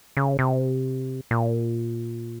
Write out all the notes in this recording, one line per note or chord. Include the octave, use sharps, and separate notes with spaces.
C#3
C3
A#2